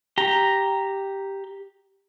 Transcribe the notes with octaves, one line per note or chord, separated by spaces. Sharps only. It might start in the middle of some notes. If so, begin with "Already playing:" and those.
G4 A#5